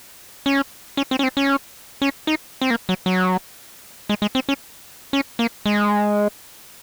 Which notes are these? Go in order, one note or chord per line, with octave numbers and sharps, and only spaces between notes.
C#4
C#4
C4
C#4
C4
C#4
C#4
D#4
C4
A#3
F#3
F#3
G#3
G#3
C4
C#4
C#4
A#3
G#3